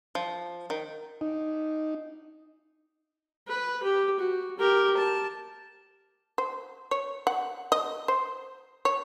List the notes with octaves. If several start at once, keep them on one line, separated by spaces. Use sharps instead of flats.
F3
D#3
D#4
B4
G4
F#4
G4 A#4
A5
C5
C#5
F#5
D#5
C5
C#5